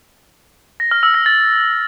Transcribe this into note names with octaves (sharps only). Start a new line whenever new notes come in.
A#6
F6
E6
A#6
A6